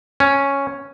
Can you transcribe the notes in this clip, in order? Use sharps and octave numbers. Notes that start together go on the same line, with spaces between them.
C#4